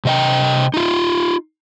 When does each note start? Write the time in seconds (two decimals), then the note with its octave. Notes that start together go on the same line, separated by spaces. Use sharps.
0.05 C3 D#5 G5
0.74 D#4 F4